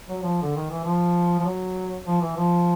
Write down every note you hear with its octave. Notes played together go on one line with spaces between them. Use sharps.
F#3
F3
D3
D#3
E3
F3
F3
F#3
F3
E3
F3